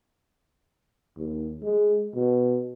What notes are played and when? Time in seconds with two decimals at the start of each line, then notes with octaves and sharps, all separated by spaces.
1.18 D#2
1.62 G#3
2.15 B2